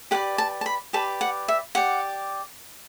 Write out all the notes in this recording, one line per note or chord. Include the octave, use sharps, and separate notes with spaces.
G4 B4 D5 F#5
A5
A5
B5
G4 B4 D5 A5
F#5
E5
G4 D5 F#5